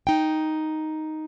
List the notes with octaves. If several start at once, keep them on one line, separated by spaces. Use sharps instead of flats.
D#4 G5